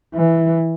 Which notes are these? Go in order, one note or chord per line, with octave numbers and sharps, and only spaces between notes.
E3